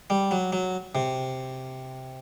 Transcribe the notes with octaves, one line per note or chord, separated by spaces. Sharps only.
G3
F#3
F#3
C3